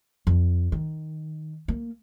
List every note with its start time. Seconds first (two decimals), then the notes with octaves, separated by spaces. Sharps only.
0.27 F2
0.72 D#3
1.68 A#3